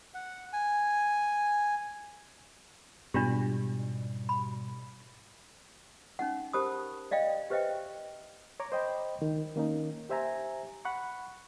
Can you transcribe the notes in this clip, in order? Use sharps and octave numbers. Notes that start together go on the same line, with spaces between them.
F#5
G#5
G#2 B2 G3 D4 F4 G4
B5
C#4 D#4 F#5
G4 A#4 C5 A5 B5 D#6
D5 D#5 F5 G5
G4 B4 C5 D#5 E5 G5
C#5 A#5 D6
C5 D#5 G5 B5
C#2 D#3
D#3 A#3 C#4 D#4
G4 C5 E5 G#5 A#5
F#5 B5 C#6